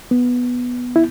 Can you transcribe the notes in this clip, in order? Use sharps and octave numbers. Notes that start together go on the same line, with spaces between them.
B3
E4